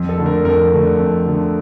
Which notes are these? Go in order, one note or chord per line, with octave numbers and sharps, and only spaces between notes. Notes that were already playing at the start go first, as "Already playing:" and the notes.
Already playing: F2
A4
D3 A3
A#4
F2 A#4
D3 A3
F2
D3 A3